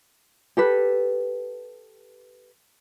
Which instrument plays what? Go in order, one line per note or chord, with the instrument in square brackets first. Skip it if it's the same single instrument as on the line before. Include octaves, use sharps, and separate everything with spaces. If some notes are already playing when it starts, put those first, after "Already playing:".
[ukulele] G4 A4 B4